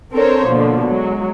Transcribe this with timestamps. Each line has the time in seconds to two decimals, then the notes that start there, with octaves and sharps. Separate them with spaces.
0.13 C4 D4 A4 A#4 C5 C#5
0.46 B2 D3 F3 A#3
0.87 F#3 G#3